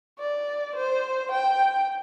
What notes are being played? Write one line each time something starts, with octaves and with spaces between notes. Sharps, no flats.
D5
C5
G5